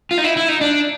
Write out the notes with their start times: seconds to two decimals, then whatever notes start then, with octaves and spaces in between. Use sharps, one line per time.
0.11 F4
0.18 D#4
0.24 E4
0.37 E4
0.48 D#4
0.61 D4